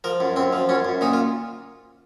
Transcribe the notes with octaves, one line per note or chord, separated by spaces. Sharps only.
F3 A#4
F#2
F#2 C4
F3
F#2 C#4
F#2
A#2 D#4
F4